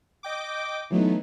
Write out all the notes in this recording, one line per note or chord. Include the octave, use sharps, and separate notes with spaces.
D#5 G5 D6
E3 F#3 A3 B3 D#4